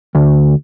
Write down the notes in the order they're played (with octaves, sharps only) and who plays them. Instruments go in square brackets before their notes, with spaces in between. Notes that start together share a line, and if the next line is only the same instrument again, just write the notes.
[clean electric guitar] D2